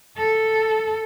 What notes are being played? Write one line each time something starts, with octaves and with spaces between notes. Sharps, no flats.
A4